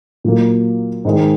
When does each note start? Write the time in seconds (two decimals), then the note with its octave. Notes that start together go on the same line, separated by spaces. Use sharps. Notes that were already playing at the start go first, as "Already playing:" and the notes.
0.24 A#2 F#3 A#3
1.05 G#2 D#3 G#3